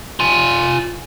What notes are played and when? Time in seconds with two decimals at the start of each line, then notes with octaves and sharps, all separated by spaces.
0.20 F4 G#5